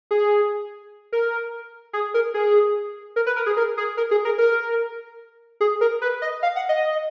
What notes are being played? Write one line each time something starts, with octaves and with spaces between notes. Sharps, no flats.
G#4
A#4
G#4
A#4
G#4
A#4
B4
A#4
G#4
A#4
G#4
A#4
G#4
A#4
A#4
G#4
A#4
B4
D#5
F5
F#5
D#5